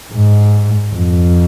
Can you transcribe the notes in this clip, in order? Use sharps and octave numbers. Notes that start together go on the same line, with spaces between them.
G#2
F2